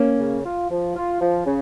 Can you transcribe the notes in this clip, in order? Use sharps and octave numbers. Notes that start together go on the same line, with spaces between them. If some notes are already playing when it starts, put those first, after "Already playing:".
Already playing: A#3 C#4
C#3
F4
F3
F4
F3
C#3